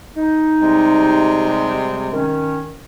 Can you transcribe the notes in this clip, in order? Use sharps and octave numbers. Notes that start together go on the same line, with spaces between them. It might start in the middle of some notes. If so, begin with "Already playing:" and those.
D#4
C3 G3 G#3
D#3 C#4